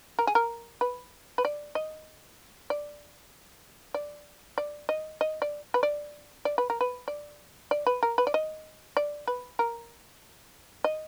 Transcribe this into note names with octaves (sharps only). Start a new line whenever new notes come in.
A#4
G#4
A#4
B4
B4
D5
D#5
D5
D5
D5
D#5
D#5
D5
B4
D5
D5
B4
A#4
B4
D5
D5
B4
A#4
B4
D5
D#5
D5
B4
A#4
D#5